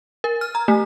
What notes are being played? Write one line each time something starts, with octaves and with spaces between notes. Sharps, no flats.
A#4
F6
A#5
A3